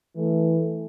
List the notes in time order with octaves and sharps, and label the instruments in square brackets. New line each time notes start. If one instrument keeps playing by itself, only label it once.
[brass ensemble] E3 A3